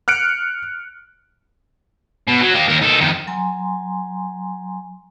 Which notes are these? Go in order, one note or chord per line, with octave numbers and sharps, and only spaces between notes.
F6 F#6 C#7 D7
B2
F#3
A#3 G4
D#2 A#4
D#4 A4
F2 D#3
F#3 G#5 A#5 C6